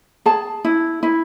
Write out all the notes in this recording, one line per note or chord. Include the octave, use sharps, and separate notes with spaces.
G#4 A5
E4
E4